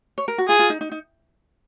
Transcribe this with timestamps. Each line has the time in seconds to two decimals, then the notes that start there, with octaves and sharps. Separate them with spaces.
0.18 C#5
0.28 A#4
0.38 F#4
0.48 F4 G#4
0.59 F4
0.70 D#4
0.81 D#4
0.92 D#4